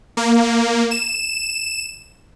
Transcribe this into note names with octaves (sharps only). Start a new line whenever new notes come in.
A#3
E7